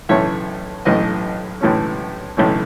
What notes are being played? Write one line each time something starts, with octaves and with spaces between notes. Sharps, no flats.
B1 A2 E3 A3 C#4 C#5 E5
B1 A2 E3 A3 C#4 B4 D#5
B1 A2 E3 A3 C#4
B1 A2 E3 A3 C#4